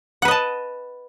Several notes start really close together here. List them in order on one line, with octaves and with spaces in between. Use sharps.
F#5 B4 D#5 A5